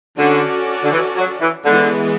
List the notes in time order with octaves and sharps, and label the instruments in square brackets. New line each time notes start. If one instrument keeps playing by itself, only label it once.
[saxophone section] D3 [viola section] C#4 F#4 A4 D5
[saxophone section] D3
E3
F#3
E3
[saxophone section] D3 [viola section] E3 G#3 B3